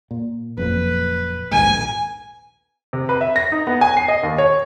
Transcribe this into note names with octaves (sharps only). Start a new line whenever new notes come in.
A#2
F#1 F2 A#2 B4
A#1 D#2 G#2 G#5
C3
B4
E5
A#6
D#4
B3
G#5
C7
D#5
D#2
C#5